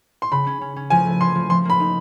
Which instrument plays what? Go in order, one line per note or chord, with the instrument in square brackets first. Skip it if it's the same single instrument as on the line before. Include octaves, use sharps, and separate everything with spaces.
[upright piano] C6
[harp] C#3 [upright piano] B5
[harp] C#4
C#4
C#4
[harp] F3 [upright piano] G#5
[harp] A3
[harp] F3 [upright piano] C6
[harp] F3
[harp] F3 [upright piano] C6
[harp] A#3 [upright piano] B5
[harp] D#4